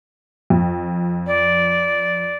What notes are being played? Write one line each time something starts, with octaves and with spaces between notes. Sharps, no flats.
F2
D5